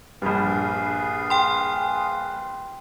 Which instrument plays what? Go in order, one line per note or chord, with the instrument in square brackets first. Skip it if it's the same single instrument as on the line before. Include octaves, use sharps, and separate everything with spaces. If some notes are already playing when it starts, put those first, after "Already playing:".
[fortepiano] A#1 G2 [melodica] G#4 B4 F5
[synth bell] G5 C6